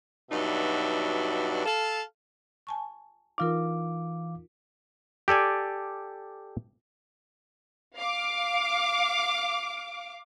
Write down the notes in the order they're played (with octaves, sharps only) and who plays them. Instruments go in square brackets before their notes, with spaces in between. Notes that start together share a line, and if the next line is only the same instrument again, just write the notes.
[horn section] G2 B2 F#3 D#4 D5 E5
A4 F5
[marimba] G#5 A5 C#6
[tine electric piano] E3 F5 D6 [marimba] D#4 F4 A#4
[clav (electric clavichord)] G4 A4 D5 G#5
[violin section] F5 D6